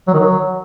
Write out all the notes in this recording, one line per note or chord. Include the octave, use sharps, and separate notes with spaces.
F#3
D#3
F#3